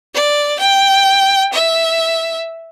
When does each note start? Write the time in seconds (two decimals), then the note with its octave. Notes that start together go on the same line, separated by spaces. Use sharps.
0.14 D5
0.59 G5
1.53 E5